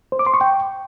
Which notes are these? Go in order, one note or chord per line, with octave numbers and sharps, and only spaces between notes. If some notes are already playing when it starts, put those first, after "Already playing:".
C5
D6
C6
C#6
G5